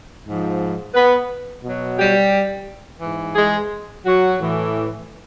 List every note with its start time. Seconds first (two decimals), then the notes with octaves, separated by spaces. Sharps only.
0.26 G#2 F3
0.94 B3 B4
1.64 B2 F#3
1.98 G3 G4
3.01 G#2 E3
3.36 G#3 G#4
4.05 F#3 F#4
4.39 A2 E3